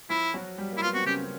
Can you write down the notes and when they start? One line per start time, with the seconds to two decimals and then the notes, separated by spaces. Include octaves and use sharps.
0.10 F3 E4 F4
0.34 F#3 F#4
0.58 G3 G4
0.72 A#3
0.77 E4
0.82 B3 F4
0.94 C4 F#4
1.06 C#3 C#4 G4
1.20 C#4